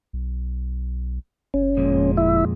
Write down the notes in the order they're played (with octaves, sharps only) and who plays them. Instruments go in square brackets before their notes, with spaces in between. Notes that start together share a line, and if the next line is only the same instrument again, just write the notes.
[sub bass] B1
[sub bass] F#1 [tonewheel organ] C#4
[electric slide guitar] F2 A#2 G#3
[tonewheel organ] E4 E5